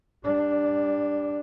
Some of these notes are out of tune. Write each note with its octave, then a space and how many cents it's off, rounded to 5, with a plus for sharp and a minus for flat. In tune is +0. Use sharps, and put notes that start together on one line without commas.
G3 +25 D4 +0